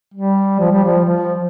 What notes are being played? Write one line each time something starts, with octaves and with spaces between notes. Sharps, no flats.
G3
F3
G3
F3
F3